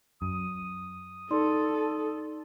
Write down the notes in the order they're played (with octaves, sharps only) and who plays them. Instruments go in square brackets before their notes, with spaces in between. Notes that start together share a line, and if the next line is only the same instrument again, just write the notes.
[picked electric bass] F#2 [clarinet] D#6
[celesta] D#4 D5 C6 [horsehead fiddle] A4